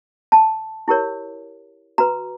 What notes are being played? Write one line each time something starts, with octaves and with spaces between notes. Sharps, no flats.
A5
E4 G4 A#4 C#5
F#4 B4 A#5